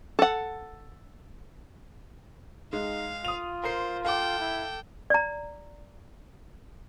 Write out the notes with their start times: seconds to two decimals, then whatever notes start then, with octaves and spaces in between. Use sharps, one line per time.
0.19 A4 F#5
2.73 G#3 D#4 F5
3.25 F4 D#6 F7
3.64 A#4 C5 A#5 C7
4.05 A4 F5 G5 D6
4.40 E4
5.10 D5 A#5